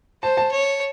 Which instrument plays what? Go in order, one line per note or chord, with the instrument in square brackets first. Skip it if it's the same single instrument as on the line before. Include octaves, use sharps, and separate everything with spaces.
[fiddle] C5 [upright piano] A5
[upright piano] A5
[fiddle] C#5